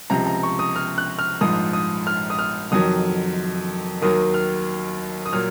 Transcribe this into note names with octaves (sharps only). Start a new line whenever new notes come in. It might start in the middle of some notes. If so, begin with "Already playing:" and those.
C#2 C3 F3 A#5
A#5
C#6
D#6
F6
F#6
F6
A#1 G#2 F3 D#6
D#6
F6
D#6
F6
F1 F2 D#3 F#3 D#6
D#2 D#3 F#3 D#6
F6
D#6
A#2 F#3 F6